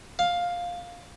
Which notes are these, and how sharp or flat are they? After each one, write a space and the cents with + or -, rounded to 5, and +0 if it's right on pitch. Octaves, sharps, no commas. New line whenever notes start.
F5 +10